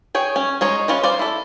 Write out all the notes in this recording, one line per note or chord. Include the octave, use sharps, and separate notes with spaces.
G#4 C#5 G5
C#4
G#3 D#4 C#5
C#4 F4 B4 D#5
C5 D5 F5
E4 A4